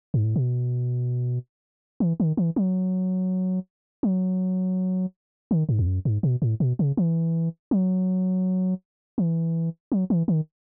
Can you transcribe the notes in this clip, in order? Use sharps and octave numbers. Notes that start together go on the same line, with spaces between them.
G#2
A2
B2
E3
D#3
E3
F#3
F#3
D#3
G#2
E2
F#2
G#2
B2
A2
B2
C#3
E3
F#3
E3
F#3
E3
D#3